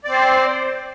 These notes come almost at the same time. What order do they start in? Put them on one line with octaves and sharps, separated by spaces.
D5 C4 C5